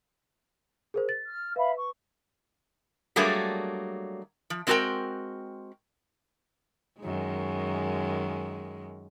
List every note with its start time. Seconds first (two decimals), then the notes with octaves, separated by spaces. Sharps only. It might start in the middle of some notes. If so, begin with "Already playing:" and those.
0.94 G#4 A#4 C5
1.09 A6
1.26 F6
1.56 B4 E5 F5 B5
1.77 C#6
3.16 F#3 G3 A3 A#3 D4 G#4
4.50 F3
4.67 G#3 C4 F#4 A4 A#4 G5
7.00 F#2 D#3 G#3